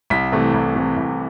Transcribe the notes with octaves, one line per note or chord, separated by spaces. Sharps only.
C2 B6
C3 E3 A3
C2
C3 E3 A3
C2